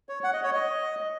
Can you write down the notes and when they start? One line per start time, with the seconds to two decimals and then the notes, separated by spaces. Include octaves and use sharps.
0.09 C#5
0.24 F#5
0.33 D#5
0.44 C#5
0.54 D#5